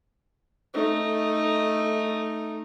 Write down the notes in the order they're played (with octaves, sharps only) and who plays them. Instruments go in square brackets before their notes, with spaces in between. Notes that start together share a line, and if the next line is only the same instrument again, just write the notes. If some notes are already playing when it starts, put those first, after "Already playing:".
[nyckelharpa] A3 D#4